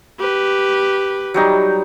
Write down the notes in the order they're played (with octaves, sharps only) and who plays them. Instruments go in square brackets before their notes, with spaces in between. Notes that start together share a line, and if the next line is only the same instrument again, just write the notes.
[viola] G4 B4
[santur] F#3 G3 D#4